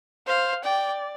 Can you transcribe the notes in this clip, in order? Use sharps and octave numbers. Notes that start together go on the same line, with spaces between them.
C5 F5
D5 G5